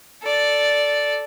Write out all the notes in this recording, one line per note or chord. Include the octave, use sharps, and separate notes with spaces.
A4 D5